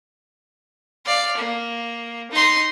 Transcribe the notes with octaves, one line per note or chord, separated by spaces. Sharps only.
D5 F5
A#3
D#4 C6